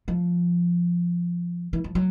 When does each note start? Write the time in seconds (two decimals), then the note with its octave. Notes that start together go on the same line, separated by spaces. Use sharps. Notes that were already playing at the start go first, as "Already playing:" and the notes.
0.08 F3
1.73 E3
1.84 F3
1.95 F#3